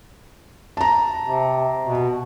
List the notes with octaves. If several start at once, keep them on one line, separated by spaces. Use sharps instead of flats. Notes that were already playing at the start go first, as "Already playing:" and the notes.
A5 A#5
C3
B2